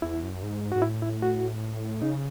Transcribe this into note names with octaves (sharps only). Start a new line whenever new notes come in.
E2 E4
F#2
G#2
G#2 F#4
A2 E4
E4
F#4
C#3 D#4